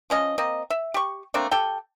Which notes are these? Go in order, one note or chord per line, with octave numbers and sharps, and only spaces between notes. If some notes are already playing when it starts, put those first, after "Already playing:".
F3 C#4 D#5
A#3 C4 D#5
E5
G4 C#6
A3 A#3 C4 D4
G4 A4 G5